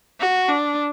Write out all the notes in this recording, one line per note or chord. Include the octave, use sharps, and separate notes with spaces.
F#4
D4